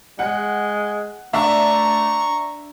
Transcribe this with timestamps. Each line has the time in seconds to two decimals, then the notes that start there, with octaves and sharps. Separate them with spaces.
0.19 G#3 F#5
1.33 A3 D4 E5 A#5 C#6